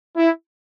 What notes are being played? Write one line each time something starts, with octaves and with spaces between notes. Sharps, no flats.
E4